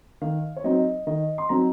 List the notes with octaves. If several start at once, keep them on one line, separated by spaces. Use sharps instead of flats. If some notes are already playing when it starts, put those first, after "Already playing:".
D#3 F5
C#5
F#3 C4 D#4 D#5
D#3 D#5
C6
F#3 C4 D#4 A#5